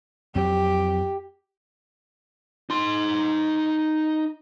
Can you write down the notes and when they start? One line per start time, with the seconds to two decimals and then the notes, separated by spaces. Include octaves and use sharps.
0.35 F2 F#3 C4 G4
2.70 D#4 C6